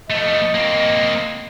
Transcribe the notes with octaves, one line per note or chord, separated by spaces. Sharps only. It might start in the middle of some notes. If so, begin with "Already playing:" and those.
F3 A3 D#5
A#3 C4